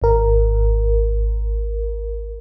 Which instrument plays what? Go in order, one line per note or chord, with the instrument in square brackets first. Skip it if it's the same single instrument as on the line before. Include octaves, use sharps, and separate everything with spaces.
[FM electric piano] G#1 A#4